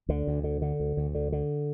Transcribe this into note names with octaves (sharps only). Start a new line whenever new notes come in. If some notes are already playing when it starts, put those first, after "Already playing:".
D2 D3
D2
D3
D3
D2
D2
D3
D3